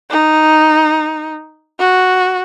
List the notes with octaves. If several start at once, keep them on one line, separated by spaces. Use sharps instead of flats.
D#4
F#4